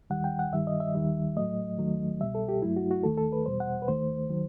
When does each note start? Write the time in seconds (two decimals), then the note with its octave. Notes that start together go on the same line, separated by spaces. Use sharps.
0.10 D#2 D#3 G3 F#5
0.24 G5
0.39 F#5
0.52 G2 D#3 G3 E5
0.67 D#5
0.80 E5
0.94 D#2 D#3 G3
1.36 A2 F#3 A3 D#5
1.78 D#2 D#3 F#3 A3
2.21 C2 B2 G3 E5
2.35 A4
2.48 G4
2.62 G2 F#3 A3 E4
2.76 F#4
2.91 F#4
3.04 D#2 D#3 A3 A4
3.17 A4
3.32 B4
3.46 E2 B2 G3 C5
3.60 F#5
3.82 B4
3.88 D#2 D#3 A3 C5
4.30 D#3 F#3